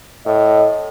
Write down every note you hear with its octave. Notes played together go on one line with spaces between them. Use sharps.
A2 D#5